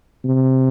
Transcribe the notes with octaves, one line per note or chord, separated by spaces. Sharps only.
C3